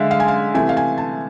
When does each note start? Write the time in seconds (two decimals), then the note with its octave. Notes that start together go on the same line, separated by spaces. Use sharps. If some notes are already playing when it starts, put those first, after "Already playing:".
Already playing: D3 G#3 E5 F5
0.11 F5
0.20 G#5
0.28 F5
0.54 C3 E3 A3 G#5
0.69 F5
0.77 G#5
0.98 A5